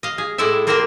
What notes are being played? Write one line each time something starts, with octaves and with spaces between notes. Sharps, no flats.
D#5 F5
G#4
A2 G#3 E4 A4 D5 E5
A#3 C4 G4 A#4 C5 G5